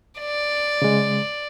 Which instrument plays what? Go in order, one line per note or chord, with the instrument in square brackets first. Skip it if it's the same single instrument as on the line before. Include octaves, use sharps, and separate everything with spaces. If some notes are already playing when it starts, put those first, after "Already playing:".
[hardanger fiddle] D5
[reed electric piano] C#3 G#3